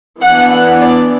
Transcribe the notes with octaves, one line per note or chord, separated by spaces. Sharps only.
E3 B3 D4 F#5
F#5
D5